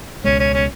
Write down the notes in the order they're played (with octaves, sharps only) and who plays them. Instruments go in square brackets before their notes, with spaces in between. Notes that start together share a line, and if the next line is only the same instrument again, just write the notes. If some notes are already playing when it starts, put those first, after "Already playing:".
[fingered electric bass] C#2 B2 G#3 [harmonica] C#4
[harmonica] C#4
C#4